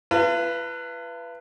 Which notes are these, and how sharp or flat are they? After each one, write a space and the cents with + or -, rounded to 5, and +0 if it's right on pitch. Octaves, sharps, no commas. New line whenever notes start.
F4 -45 B4 +0 A5 +45